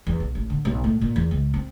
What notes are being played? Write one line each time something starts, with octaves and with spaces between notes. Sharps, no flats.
E2
B1
A1
D3
B1
A2
A#2
E2
C#2
C4